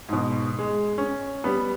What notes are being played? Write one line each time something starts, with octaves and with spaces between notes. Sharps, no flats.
G#2 B2
G#3
C#4
G3 B3